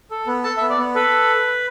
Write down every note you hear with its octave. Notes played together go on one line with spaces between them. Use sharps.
A4
B3
A4 A5
E5
B3
D5
B3
A4 B4